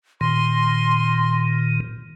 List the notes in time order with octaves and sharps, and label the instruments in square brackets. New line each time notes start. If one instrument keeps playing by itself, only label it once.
[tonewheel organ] A#2 D#3 [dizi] C6